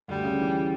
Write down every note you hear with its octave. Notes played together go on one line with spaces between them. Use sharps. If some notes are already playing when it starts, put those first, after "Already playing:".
D2 G3
C#3
E3